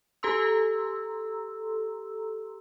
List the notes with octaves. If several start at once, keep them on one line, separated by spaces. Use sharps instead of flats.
G4 A4 A#5 C6 E6